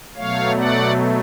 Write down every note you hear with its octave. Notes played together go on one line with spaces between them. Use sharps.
B2 F#3 A3 C#5 F5
D5 F#5